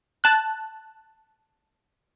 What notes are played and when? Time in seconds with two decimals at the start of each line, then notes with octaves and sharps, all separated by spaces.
0.24 A5 F#6